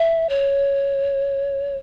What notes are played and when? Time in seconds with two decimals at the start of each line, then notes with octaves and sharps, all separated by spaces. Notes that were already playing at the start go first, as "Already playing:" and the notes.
Already playing: E5
0.29 C#5